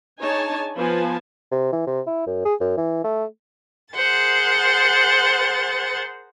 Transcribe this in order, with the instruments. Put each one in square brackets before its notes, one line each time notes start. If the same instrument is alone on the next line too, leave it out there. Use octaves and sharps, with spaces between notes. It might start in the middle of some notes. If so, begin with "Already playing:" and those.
[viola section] D4 D#4 G#4 C#5 G#5 A5
F3 B3 B4 G#5 A5
[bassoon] C3
E3
C3
E4
F#2
G#4
F#2
E3
A3
[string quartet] G#4 A#4 C5 F#5 A6